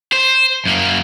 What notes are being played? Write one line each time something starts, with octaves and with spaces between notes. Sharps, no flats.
C5
F#2 A#3